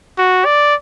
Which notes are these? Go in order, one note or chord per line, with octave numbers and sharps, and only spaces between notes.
F#4
D5